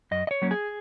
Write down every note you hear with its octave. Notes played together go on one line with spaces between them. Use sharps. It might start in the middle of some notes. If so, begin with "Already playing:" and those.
F#2 D#5
D#5
C#5
F#3 A#3 C#4
G#4